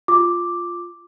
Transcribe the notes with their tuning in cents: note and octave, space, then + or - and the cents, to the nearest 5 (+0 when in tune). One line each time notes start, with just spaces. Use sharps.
F4 +0 D6 +0